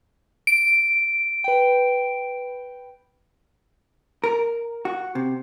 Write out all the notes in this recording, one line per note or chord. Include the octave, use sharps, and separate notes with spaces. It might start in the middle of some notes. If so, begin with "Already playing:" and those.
D7
B4 G5
A#4
F#4
C3